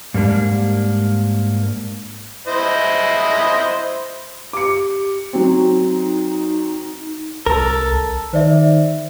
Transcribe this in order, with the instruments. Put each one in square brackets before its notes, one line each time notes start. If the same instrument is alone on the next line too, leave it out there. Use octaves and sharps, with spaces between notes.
[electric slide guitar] G#2 G3 A#3 D4
[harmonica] E4 C5 D#5
[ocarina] G4 [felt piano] D6 C#7
[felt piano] F#3 C4 [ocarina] D#4
[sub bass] C2 [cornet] A4 [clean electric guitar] A#4
[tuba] D#3 [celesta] C5 D5 E5